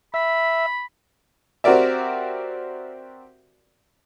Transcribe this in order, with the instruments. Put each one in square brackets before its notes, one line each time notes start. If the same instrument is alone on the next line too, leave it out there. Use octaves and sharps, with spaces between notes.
[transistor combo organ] E5 [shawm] B5
[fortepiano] C4 F#4 G4 A#4 D5 E5